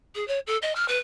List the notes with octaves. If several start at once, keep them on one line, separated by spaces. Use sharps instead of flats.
G#4
C#5
A4
D#5
F6
B4